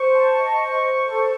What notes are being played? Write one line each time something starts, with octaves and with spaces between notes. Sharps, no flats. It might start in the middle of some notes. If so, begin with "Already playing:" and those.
Already playing: C5 C#6
A5
D#5
C5
C5
A4